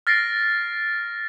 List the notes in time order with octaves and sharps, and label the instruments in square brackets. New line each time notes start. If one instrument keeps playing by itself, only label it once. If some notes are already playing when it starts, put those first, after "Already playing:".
[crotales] F6 A6 A#6 C7 D7